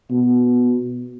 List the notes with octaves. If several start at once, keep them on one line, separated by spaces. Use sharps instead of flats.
B2